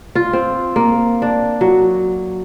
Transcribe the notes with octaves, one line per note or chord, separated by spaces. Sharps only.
F4
C4
A#3
D4
F#3